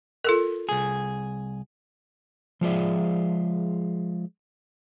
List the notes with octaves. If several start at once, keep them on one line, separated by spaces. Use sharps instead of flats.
F4 A4 A#4
C2 G#4
F3 G#3 F4 G#4 D5 E5